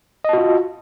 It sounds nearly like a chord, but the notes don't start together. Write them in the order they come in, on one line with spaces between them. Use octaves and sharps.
D#5 A5 F#4 F4